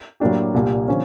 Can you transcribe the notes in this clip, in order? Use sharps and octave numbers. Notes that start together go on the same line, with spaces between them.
A2 F#3 A#3 D4 G4
C2 A#2 G3 A#3
D3 F3 A#3 C#4